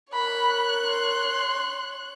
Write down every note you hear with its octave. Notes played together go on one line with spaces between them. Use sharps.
A#4 C#5 B5 F#6
C6